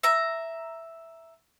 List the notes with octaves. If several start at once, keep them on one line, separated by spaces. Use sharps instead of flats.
E5 A#5